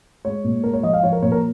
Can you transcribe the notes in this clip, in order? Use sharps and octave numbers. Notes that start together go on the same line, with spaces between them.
G#3 C#5
A#2
G#3 A#4
C#5
F3 D#5
F5
F3 C#5
A#4
A#2 C#5
A#4